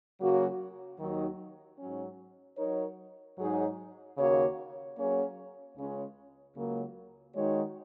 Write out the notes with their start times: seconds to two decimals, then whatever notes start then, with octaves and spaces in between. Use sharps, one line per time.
0.19 C#3 F#3 A#3 F#4 C#5
0.98 D#2 D#3 F#3 D#4
1.78 G#2 F#3 C#4
2.58 F#3 D#4 A#4 C#5
3.38 G#2 F#3 D#4 G#4 C#5
4.17 D#2 C#3 A#3 F#4 C#5
4.97 F#3 A#3 C#4 G#4 C#5
5.75 C#2 C#3 G#3 C#4
6.55 C#2 C#3 F#3 A#3
7.35 D#3 G#3 D#4 F#4 C#5